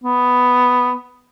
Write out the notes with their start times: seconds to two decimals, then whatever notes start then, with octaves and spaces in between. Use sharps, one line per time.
0.04 B3